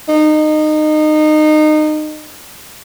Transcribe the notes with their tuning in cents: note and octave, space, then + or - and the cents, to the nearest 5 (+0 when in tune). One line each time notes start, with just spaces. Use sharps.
D#4 -25